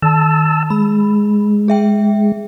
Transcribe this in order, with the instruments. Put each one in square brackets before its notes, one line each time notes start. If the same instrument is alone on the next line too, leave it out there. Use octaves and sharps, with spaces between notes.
[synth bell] D#3 [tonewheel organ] A5 E6
[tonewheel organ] G#3 [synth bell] B5
[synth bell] G#4 E5 G5